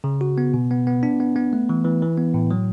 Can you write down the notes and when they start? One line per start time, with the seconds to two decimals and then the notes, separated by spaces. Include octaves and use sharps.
0.04 C#3
0.21 F#4
0.38 B3
0.54 B2
0.71 B3
0.87 B3
1.03 D4
1.20 B3
1.36 B3
1.53 A3
1.69 E3
1.85 E3
2.02 E3
2.18 B3
2.34 A2
2.51 F#3